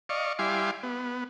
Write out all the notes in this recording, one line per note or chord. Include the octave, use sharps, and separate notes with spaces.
D5 D#5 F5 C#6
G3 E4 F5 G#5 C6 D6
B3